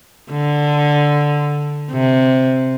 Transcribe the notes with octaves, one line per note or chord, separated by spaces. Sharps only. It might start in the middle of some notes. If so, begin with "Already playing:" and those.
D3
C3